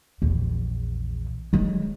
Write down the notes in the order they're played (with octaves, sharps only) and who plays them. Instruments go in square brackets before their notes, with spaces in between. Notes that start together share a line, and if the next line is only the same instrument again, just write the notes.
[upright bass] A#1 E2
F#3 G#3